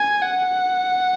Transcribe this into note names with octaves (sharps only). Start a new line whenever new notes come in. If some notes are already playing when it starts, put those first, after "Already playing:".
Already playing: G#5
F#5